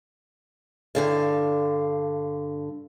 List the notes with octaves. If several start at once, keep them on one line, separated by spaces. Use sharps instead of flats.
G2 D3 F5